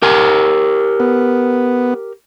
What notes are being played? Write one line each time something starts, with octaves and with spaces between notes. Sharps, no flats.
G4 A#4 G#5
B3